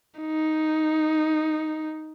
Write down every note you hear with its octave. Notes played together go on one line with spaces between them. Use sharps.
D#4